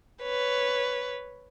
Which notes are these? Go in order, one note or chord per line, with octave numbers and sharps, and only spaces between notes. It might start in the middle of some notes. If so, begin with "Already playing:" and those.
B4 C#5